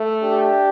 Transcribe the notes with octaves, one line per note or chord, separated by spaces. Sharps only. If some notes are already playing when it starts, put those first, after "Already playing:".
Already playing: A3
D4 G4